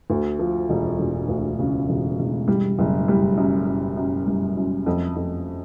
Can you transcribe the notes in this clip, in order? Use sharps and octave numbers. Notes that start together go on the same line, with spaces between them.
D2
F3
E1
E1
D2
C#3
E1
E1
G3
F#1
G3
F#2
F#2
F#2
G3
F#2
F2
F2